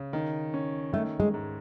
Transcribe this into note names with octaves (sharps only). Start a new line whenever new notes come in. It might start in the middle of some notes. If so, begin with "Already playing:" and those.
Already playing: C#3
D#3
C#4
D#3 A3
G#3
G#2